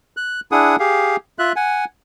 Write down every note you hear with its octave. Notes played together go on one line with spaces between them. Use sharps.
F#6
D4 E4 G#4 F#5 D#6
G4 G#4 F5
F4 E5 F#6
F#5 G#5